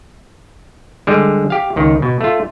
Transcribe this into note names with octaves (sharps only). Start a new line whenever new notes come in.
D3 G3 G#3
G4 F5
C#2 D#3
B2
A3 F4